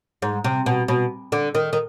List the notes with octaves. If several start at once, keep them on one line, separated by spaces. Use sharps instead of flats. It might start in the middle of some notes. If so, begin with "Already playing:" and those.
G#2
C3
B2
B2
D3
D#3
D#3